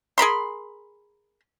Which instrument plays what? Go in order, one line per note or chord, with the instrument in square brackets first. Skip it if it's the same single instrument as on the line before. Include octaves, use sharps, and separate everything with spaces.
[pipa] G#4 A#4 B5 C6